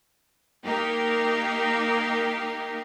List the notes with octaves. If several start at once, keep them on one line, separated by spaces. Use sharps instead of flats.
A#3 D#4 G4 A#4